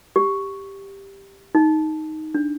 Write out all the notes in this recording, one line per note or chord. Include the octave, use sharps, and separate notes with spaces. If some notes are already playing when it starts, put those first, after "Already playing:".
G4
D#4
D4